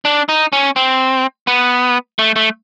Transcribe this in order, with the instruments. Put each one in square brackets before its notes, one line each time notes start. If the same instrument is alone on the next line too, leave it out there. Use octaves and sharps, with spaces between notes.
[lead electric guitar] D4
D#4
C#4
C4
B3
A3
A3